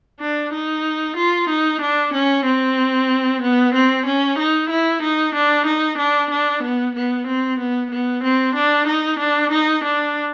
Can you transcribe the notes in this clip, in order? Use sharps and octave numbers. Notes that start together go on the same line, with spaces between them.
D4
D#4
F4
D#4
D4
C#4
C4
B3
C4
C#4
D#4
E4
D#4
D4
D#4
D4
D4
B3
B3
C4
B3
B3
C4
D4
D#4
D4
D#4
D4